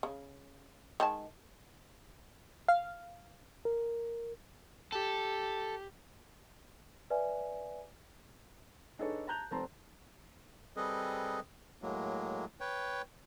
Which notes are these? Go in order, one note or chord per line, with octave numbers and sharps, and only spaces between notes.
C#3
D#3 G#3 A5
F5
A#4
G4 A4
B4 D5 E5 G#5
D4 D#4 G#4 A4 B4 C#5
A5 A#5 F#6 G6 F7
F1 C4 A5 A#5 C6
G3 C4 G#4 A4 B4 D#5
A2 F#3 G#3 A#3
B4 C#5 G5